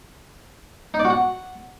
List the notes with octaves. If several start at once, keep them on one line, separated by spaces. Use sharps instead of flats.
D#4
D5
F#4
F#5